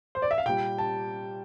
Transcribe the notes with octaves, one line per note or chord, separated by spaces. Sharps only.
C5
D5
E5
F5
A#2 G3 G5
A5